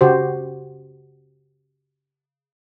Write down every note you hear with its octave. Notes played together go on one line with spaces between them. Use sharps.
C#3 F#4 G4 C5